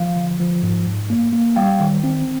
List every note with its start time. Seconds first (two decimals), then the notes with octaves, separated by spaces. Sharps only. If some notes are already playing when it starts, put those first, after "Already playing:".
Already playing: F3 F5
0.16 D3
0.40 F3
0.63 G#2
0.87 G#2
1.10 A#3
1.33 A#3
1.56 G3 F5 G5
1.80 D#3
2.04 C4